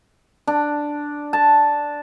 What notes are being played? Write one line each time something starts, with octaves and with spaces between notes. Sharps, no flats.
D4
A5